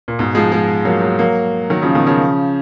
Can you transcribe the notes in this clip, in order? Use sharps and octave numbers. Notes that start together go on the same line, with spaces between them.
A#2
G#2 B2
F3 G#3
F3 G#3
F#3 A#3
F#3 A#3
F#3 A#3
D#3 F#3
C#3 F3
B2 D#3
C#3 F3